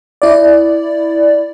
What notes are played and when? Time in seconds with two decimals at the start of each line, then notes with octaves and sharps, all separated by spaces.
0.22 E4 D5